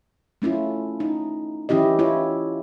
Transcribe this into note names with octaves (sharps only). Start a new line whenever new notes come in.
A3 C#4 E4 F4
D#4
E3 C#4 E4 G4 D#5
E4 F4 C#5